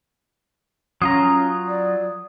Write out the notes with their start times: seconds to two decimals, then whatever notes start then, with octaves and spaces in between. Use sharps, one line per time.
1.02 F#3 C#4 F4 A#5 D#6
1.68 D5